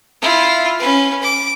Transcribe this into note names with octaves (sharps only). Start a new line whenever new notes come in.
E4 F4
C#4 B4
D6